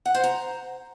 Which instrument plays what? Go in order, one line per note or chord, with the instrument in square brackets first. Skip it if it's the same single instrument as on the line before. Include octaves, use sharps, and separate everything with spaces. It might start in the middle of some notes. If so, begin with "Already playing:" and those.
[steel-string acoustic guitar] F#5
C5
A#5